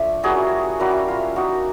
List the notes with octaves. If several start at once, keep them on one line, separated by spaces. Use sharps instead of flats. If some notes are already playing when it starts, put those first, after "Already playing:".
Already playing: F3 A3 D4
G3 A#3 C#4 E4 F#4 G#4
G3 A#3 C#4 E4 F#4
F4
A#3 D#4 F#4